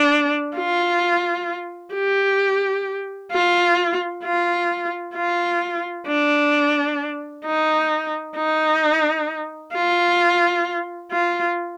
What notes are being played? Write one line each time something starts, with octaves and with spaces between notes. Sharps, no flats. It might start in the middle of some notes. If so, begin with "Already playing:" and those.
Already playing: D4
F4
G4
F4
F4
F4
D4
D#4
D#4
F4
F4